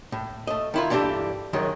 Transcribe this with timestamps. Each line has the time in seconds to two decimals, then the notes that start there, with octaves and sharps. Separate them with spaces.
0.12 A2
0.47 A3 D#5
0.74 D#3 E4 F4
0.90 G2 E3 D4 D#4 G4 A4
1.53 F#2 D#3 F#3 G#3